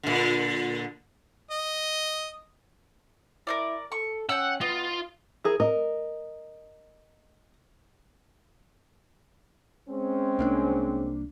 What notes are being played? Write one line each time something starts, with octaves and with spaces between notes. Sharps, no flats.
A#2 D3
D#5
E4 A#4 C5 D5
A4 C#6
C#4 F#5 G5 E6
B3 F4 D#5
E4 G#4 A#4
A#4 D#5
G#3 C4 C#4
C2 A#3 D4